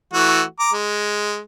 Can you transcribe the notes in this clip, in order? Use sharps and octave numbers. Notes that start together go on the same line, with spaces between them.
E3 A3 F#4
A#5 D6
G#3